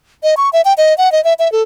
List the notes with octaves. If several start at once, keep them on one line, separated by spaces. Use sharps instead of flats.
D#5
C#6
E5
G5
D#5
F#5
D#5
E5
E5
A4